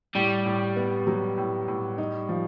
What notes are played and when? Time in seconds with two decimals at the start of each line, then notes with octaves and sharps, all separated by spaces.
0.15 A2 G3
0.46 A2
0.76 B3
1.07 F#3
1.37 A2
1.68 A2
1.98 D#4
2.29 F3